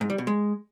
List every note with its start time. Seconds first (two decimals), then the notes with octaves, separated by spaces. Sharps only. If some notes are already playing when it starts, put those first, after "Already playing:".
0.01 G#2
0.10 G3
0.18 B2
0.27 G#3